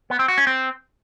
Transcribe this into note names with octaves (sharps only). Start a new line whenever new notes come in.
B3
C4
F#4
C#4
C4